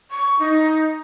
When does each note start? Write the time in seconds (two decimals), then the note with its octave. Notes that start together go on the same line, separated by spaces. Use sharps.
0.11 C#6
0.39 D#4